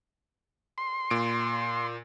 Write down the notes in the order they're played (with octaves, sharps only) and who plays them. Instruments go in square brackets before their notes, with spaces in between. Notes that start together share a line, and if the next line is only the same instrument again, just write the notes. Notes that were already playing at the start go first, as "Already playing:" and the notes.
[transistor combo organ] C6
[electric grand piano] A#2 D7